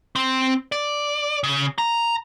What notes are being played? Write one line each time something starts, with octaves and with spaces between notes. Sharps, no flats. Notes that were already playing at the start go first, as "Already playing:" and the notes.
C4
D5
C#3
A#5